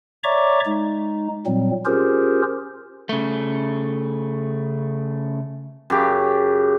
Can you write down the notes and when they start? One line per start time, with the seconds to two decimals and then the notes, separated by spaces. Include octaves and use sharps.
0.24 C#5 D5 E5 A#5 C#6 D6
0.65 G#3 D#4
1.46 A#2 F#3 G3 C4
1.85 C#4 F4 G4 G#4 A#4 C5
3.09 C#3 A3
5.90 F#2 C#3 G4